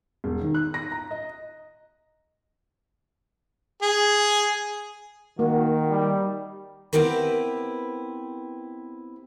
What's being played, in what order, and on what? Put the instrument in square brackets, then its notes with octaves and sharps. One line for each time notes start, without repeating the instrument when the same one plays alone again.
[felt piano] E1
D#3
F#6
A#6
A#5
D#5
[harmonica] G#4
[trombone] D#3 [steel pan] A#3 [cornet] F#4
[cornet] G3
[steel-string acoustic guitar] B3 C4 E4 G4 A#4 B4